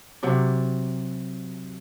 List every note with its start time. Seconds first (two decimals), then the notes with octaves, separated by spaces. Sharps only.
0.23 C3 F#3 D5